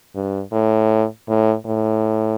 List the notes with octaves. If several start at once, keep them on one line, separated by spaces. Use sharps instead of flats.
G2
A2
A2
A2